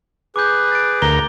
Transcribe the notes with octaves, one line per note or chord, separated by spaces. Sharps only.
G#4 B4 D6 G6
A6 D7
D2 A#4 A#5 G7